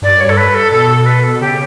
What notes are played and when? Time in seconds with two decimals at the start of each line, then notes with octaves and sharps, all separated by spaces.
0.02 G2 D5
0.12 F#2
0.20 G2 C#5
0.29 A4
0.37 B4
0.55 A4
0.72 B2 A4
0.90 A4
1.06 B4
1.24 A4
1.41 C#3 G4